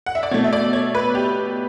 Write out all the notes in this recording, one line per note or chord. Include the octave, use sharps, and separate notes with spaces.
F#5
E5
D5
B2 A3 C#5
E5
D5
C#5
B4
G4